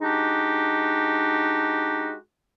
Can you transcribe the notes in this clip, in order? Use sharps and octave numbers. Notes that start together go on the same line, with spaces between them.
G#3 D4 D#4 F#4 G4